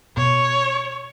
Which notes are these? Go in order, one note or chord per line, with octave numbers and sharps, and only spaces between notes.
B2 C#5